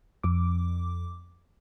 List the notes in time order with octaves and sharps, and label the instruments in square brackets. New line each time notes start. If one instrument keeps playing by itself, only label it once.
[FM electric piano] F2 D6